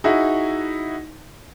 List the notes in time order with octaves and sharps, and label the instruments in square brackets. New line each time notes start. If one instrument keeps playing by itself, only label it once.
[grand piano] D#4 E4 F#4 G#4